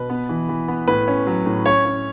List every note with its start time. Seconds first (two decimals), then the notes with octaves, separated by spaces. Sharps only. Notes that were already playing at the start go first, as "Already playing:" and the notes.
Already playing: B2 B4
0.10 B3
0.29 E3
0.49 E3
0.68 B3
0.87 A2 B4
1.08 C#4
1.27 F#3
1.46 A2
1.65 C#4 C#5
1.85 C#4